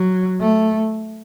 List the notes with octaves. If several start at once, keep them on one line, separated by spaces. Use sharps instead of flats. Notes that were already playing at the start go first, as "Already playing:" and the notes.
Already playing: F#3
A3